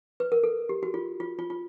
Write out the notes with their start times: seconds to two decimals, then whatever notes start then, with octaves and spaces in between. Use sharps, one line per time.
0.20 B4
0.32 A#4
0.43 A4
0.69 G4
0.83 F#4
0.94 F4
1.20 F4
1.39 F4
1.50 F4